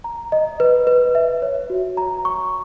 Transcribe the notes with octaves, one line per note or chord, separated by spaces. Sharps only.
A#5
D#5
B4
B4
E5
C#5
F#4
A#5
C#6